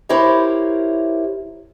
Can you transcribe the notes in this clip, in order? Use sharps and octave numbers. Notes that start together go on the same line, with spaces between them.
E4 G4 A#4 C5 C#5 E5